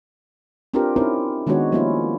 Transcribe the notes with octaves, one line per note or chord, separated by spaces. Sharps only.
C4 D4 F4 G4 A#4 B4
C4 C#4 D#4 E4 A#4 C5
D#3 G#3 B3 D4 F#4 C#5
F3 G3 A#3 C#4 E4 F4